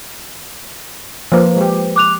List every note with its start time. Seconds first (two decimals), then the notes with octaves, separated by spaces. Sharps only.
1.32 F3 A#3 B4 C5
1.56 G#3 G4
1.96 D6 F#6 F7